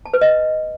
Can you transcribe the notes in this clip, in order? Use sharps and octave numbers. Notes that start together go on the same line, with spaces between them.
A5
B4
D#5